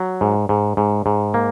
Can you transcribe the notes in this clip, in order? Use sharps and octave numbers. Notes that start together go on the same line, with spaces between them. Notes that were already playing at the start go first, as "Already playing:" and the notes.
Already playing: F#3
G#2
G#2
G#2
G#2
A#3